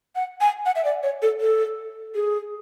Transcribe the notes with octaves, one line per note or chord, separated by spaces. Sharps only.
F#5
G#5
F#5
E5
D5
C#5
A4
A4
G#4